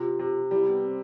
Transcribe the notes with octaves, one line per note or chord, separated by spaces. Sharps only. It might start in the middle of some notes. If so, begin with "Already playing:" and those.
Already playing: C3 F4
C3
G3 E4
B3
C4